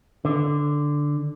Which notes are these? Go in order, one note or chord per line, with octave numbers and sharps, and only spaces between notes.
D3